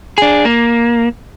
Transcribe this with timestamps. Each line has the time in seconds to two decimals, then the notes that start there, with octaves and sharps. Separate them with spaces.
0.18 D4 G#4
0.45 A#3